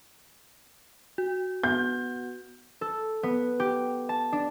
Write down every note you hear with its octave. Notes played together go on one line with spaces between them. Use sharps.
F#4
B3 G6
A4
B3
G4
A5
D4